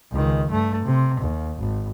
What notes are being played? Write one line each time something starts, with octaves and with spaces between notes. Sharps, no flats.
C#2 D#3
G2 A3
C3
D#2
G#1